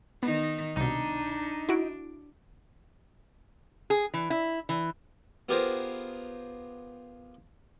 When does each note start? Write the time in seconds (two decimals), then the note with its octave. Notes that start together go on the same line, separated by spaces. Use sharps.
0.23 D#3 B3 D#4
0.77 C2 B2 D4 D#4
1.69 E4 F#4 D7
3.90 G#4
4.14 E3
4.30 E4
4.69 E3
5.49 B3 F4 G4 G#4 A#4 C5